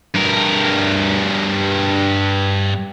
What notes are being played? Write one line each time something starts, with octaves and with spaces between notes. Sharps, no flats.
G2 A#4